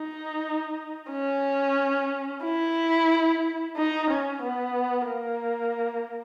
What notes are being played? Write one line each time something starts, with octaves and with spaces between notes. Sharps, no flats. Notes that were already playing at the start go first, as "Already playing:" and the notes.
Already playing: D#4
C#4
E4
D#4
C#4
B3
A#3